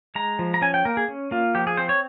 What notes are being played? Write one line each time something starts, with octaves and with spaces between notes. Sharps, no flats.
G#3 A#5
F3
A#5
C#4 G#5
G5
A#3 A#4
G#4
C#4
A#3 F4
F3 G4
G#4
C4 C5
C#5